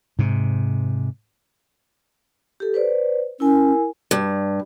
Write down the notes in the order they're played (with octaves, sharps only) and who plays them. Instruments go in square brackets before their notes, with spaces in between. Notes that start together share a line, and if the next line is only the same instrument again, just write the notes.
[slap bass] G#2 C3
[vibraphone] G4 A4
B4 C5 D5
[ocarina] C#4 [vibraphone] E4 A#4 G#5
[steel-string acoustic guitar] G2